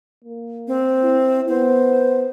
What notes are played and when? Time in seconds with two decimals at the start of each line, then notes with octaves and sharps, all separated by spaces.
0.24 A#3
0.68 C4
1.03 E4
1.49 B3 C5